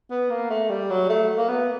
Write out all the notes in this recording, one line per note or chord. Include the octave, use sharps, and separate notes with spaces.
B3
A#3
A3
G3
F#3
A3
A#3
B3